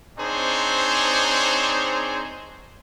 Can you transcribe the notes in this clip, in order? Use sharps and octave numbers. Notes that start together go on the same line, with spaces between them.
C4 D4 D#4 G#4 C5 C#5